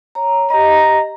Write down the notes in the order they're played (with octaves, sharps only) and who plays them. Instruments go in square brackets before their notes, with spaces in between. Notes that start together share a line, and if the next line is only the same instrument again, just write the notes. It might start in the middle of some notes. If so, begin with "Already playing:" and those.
[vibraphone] C#5 A#5
[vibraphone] G4 D#5 [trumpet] A#5